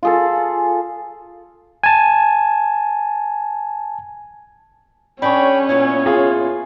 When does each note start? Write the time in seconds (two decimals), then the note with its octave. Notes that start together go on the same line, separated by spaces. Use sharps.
0.03 F4 G#4 A4
1.83 G#5 A5
5.22 C#4 D4 G#4 C#5 G5 B5
5.69 A#2 B3 E4 C#5
6.06 F4 G#4